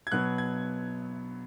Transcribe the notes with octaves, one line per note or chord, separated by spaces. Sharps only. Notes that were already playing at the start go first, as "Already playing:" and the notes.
G#6
B2 F#3 B3 F#6
G#6